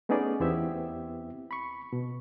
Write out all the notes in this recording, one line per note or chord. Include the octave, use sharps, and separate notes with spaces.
A3 B3 C#4 D#4 G#4 D5
E2 B3 C4 E4 G4 E5
B5 C#6
B2